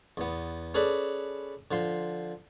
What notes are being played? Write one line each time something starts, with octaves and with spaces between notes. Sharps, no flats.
E2 B3
C#4 G#4 A4 B4 D5 B5
D3 F3 C6